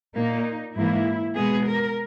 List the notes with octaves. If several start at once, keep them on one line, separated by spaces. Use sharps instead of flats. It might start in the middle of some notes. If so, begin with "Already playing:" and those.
A#2 A#3 D#4
G#2 E3 A#3 E4
B2 G#3 B3 G#4
A#4